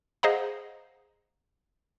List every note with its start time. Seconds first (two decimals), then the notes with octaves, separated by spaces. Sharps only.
0.23 G#4 C5 D#5 F5 F#5 A#5